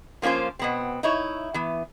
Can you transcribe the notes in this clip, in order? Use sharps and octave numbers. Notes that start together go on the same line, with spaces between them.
F3 A#3 C#4 F4 C5
B2 B3 C4
D#4 E4 C#5
E3 B3